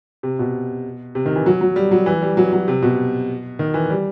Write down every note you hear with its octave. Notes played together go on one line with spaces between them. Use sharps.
C3
B2
C3
D#3
E3
F#3
F#3
G3
F#3
E3
G3
F#3
F#3
C3
B2
D#3
E3
G3